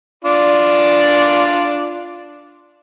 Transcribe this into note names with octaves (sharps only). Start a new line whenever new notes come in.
D4 F4 D5